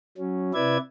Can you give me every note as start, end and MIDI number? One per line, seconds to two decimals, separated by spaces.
0.18 0.52 54
0.18 0.52 61
0.54 0.78 48
0.54 0.78 64
0.54 0.78 71
0.54 0.78 74
0.54 0.78 76
0.54 0.78 92